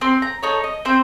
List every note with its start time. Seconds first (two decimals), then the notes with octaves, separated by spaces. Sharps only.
0.01 C4 C6
0.22 A#5
0.43 D#4 A4 C#5
0.64 D#5
0.85 C4 C5